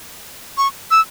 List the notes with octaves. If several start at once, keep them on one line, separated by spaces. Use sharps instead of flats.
C#6
E6